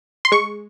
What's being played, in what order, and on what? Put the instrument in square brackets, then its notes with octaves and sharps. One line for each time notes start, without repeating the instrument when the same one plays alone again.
[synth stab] C6
G#3 C#6